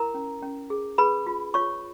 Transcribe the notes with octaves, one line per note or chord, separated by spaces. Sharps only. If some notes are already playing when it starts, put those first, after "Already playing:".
Already playing: E4 A#4 A#5
C#4
C#4
G#4
G#4 B4 B5
F4
F4 C#5 C#6